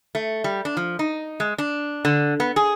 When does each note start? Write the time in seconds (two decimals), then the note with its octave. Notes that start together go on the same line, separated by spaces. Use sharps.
0.15 A3
0.44 G3
0.65 D4
0.77 F3
0.99 D#4
1.40 G#3
1.58 D4
2.05 D3
2.40 B3
2.56 G#4